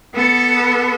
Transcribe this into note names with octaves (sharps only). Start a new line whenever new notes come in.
B3 A4